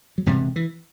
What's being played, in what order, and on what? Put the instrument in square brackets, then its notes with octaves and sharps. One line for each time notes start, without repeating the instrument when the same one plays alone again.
[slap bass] F#3
E1 D2 G2 C3 G3
E3